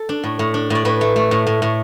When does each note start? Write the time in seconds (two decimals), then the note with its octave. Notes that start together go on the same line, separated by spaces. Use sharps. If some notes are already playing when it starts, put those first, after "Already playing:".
Already playing: A4
0.09 D4
0.24 A2
0.39 A2
0.54 D4
0.70 A2 D5
0.85 A2 B4
1.01 A3
1.16 A3
1.31 A2
1.47 A2
1.62 A2